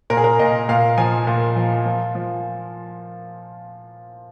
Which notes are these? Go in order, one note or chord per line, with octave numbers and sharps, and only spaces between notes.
A#2 A#4
G#4
A#4
A#2 D#5
A#2 F5
F3 G#5
A#2
F3
F3
F3